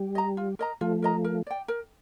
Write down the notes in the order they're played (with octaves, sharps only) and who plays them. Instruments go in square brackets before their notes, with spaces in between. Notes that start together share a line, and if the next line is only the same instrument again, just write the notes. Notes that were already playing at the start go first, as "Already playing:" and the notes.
Already playing: [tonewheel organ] G3
[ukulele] D#5 A#5
F4
A#4 D#5 A#5
[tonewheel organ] F3 A3 [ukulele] F4
[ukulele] A#4 D#5 A#5
A#4
D5 G5
A#4